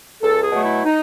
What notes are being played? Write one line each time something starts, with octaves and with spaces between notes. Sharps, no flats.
C#2 A4
G#4
B2 F#3 A3
E4
D#4